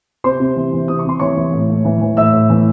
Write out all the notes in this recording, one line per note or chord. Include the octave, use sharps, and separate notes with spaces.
C3 C5 C6
C3
E3
E3
C3 D#6
C#6
C3 C6
E3 C#5 C#6
E3
A2
A2
E3
E3
A2 E5 E6
A2
E3